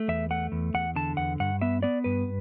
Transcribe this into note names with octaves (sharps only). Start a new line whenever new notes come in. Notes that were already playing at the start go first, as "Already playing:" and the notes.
Already playing: A3
E2 E5
A3 F#5
E2
E2 F#5
D3 A5
E2 F#5
G2 F#5
B3 E5
B3 D5
G2 B4